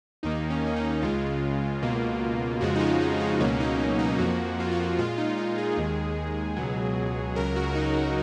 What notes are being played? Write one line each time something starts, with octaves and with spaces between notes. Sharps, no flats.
D#2 D#3 A#3 D#4
C#4
C#4
D#4
C#2 C#3 G#3 F4
C#2 B2 A#3
F2 C#3 F3 G#3 F#4
D#4
F4
D#4
D#4
C#2 B2 F#3 A#3 C#4
D#4
C#4
D#4
F2 F3 A#3 F#4
F4
F#4
A#2 G#3 F4
D#4
F4
G#4
D#2 D#3 G#3
C#2 B2 F#3
C#2 C#3 F#3 A#4
F#4
D#4
D#4